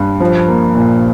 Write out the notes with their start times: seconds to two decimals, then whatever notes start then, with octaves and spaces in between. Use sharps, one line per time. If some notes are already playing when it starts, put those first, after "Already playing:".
Already playing: G2
0.20 F3
0.48 A#3
0.75 A#2